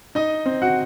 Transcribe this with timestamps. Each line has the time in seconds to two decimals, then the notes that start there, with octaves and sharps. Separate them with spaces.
0.15 D#4 D#5
0.46 C4
0.62 F#4 F#5